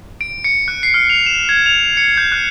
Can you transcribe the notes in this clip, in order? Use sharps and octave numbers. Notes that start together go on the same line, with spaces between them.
D7
C#7
F#6
C7
F6
F7
E7
G#6
F7
C#7
G6
F#6